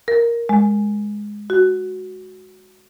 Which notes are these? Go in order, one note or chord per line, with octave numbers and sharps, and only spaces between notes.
A#4
G#3
F#4